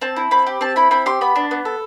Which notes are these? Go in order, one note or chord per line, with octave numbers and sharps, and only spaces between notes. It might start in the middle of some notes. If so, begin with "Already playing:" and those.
C4 A5
E4
C4 B5
G4
C4 A5
E4 B5
C4 B5
G4 C6
B3 B5
D4
B3
A4